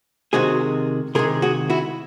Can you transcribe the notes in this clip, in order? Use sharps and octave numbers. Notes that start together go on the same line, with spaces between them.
C3 D#3 G#3 F#4 G#4
C3 D#3 G#3 G#4 A#4
F#4 G#4
E4 F#4